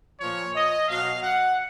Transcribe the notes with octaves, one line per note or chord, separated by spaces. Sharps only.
A#2 F3 C#5
D#5
B2 F#3 F5
F#5